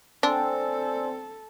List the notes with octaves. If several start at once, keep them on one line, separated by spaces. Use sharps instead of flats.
C4 D4 A4 D5 G#5 E6